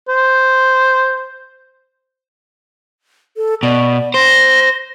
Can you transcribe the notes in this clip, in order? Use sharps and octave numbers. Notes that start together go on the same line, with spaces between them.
C5
A4
B2 D5
C5 A#6